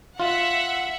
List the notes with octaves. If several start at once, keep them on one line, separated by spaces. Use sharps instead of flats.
F4 E5 F#5